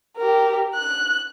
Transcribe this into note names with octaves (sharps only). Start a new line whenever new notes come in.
G4 A#4
F#6